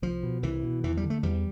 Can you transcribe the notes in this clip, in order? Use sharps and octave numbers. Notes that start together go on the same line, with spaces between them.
C2 F3
B2
C2 E3
B2
E2 E3
G3
D3
A3
E2 G3